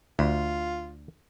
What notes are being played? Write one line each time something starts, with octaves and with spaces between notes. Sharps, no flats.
D2 F4